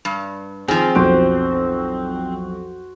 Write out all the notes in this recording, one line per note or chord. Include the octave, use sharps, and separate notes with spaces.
G2
D#3 F3 C4 G#4
B1 F2 F#4 C5 D7